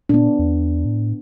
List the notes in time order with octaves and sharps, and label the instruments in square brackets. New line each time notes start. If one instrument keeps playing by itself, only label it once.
[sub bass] A#2 [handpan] B3 D4
[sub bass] E2
A2